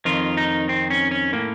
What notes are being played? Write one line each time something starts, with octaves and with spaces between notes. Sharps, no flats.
F2 D#3 F4
D#4
C4
C#4
C#4
A2 A#3